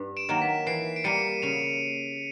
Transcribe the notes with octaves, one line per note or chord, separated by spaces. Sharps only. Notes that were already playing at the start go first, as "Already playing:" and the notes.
Already playing: G2
D7 E7
D#3 F#3 A#3
B6
E3 C7 D7
D7
G3 A#3 C#7 D#7
C#3 D#7 F7